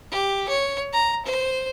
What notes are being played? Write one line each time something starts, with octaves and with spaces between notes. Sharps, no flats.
G4
C#5
A#5
C5